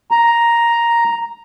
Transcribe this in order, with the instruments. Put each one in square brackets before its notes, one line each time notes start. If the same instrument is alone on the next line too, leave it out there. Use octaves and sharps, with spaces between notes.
[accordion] A#5